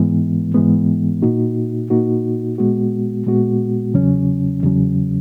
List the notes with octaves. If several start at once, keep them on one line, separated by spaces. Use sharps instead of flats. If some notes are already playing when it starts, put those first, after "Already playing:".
Already playing: G#2 E3 G#3 B3
G#2 E3 G#3 B3
A#2 A#3 D#4 F#4
A#2 A#3 D#4 F#4
A#2 G#3 B3 F#4
A#2 G#3 B3 F#4
E2 C#3 F#3 C#4
E2 C#3 F#3 C#4